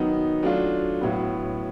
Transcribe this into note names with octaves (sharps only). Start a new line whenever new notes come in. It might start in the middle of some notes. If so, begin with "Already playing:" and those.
Already playing: D#3 F#3 B3 D#4
F#3 A3 D4 F4
A2 F#3 B3